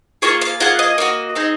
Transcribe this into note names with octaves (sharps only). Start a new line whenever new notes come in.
A#3 F4 G#4 C#6
F5
A#3 F4 G#4 F#5
D#5
A#3 D#4 F#4
C4 D#4 G#4